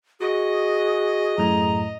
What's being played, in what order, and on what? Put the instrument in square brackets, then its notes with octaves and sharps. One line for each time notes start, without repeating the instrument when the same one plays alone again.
[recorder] F#4 [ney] G#4 [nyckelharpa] D#5
[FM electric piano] F#2 A2 [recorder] A#5